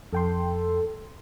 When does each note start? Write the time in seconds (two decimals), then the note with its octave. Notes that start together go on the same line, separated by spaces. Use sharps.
0.13 F2 A4 G5 C6